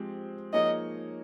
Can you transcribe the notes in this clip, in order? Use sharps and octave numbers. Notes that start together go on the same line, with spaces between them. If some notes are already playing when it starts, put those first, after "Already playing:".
Already playing: F3 G#3 C4 G4
F3 A#3 D#4 G#4 C#5 D#5